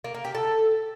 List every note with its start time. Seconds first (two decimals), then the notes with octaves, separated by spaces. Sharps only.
0.04 A#3
0.15 A#3
0.25 G4
0.35 A4